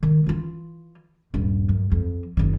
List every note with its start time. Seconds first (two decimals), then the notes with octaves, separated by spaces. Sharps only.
0.03 D#3
0.26 E3 F4
1.34 D#1 G2
1.69 F#2
1.92 F2
2.37 F#1 D#3